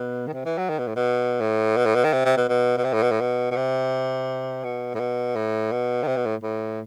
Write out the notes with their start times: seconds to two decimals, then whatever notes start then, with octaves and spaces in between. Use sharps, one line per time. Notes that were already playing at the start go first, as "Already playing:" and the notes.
Already playing: B2
0.27 D#3
0.34 C3
0.46 E3
0.58 F#3
0.70 D#3
0.79 B2
0.87 A2
0.96 B2
1.41 A2
1.77 B2
1.86 A2
1.95 B2
2.04 D#3
2.13 C3
2.25 C3
2.37 B2
2.49 B2
2.77 B2
2.84 C3
2.93 A2
3.03 B2
3.12 A2
3.21 B2
3.51 B2
3.57 C3
4.64 B2
4.95 A2
5.00 B2
5.36 A2
5.72 B2
6.03 D#3
6.07 C3
6.17 B2
6.26 A2
6.43 A2